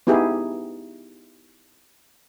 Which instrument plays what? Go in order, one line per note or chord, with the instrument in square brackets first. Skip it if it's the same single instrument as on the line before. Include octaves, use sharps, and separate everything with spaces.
[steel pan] B3 D#4 E4 G4 G#4